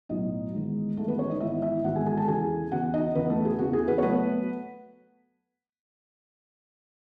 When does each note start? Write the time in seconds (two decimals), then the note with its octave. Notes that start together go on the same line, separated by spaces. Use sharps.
0.09 B1 A2 F#3 B3 D#4 D#5
0.53 G#1 G#2 E3 G#3 B3
0.97 G#1 G#2 E3 G#3 A3 B3 A4
1.08 B3 B4
1.19 C#4 C#5
1.29 D#4 D#5
1.40 G#1 G#2 E3 G#3 B3 E4 E5
1.62 E4 E5
1.84 G#1 G#2 E3 G#3 B3 F#4 F#5
1.95 G#4 G#5
2.06 G#4 G#5
2.17 A4 A5
2.28 E2 C#3 E3 B3 G#4 G#5
2.71 E2 C#3 E3 B3 F#4 F#5
2.93 D#4 D#5
3.15 E2 C#3 E3 B3 B4
3.30 A3 A4
3.45 G#4
3.59 E2 C#3 E3 B3 F#4
3.73 G#4
3.88 B3 B4
3.98 C#5
4.02 F#3 A3 B3 B4